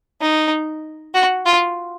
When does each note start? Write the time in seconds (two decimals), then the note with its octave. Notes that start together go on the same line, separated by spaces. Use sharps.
0.21 D#4
1.14 F#4
1.45 F4